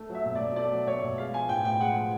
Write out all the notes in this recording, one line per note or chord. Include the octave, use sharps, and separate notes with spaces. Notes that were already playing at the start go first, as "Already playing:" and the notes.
Already playing: A3
F#3
E5
B2
D5
B2
A3 D5
F#3
B2 C#5
B2
G#3 F5
F3 G#5
A2 G5
A2 G5
G#3 F#5
F3